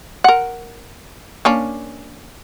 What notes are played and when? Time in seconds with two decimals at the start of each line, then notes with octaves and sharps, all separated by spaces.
0.24 A#4 F#5
1.45 A#3 C#4 D4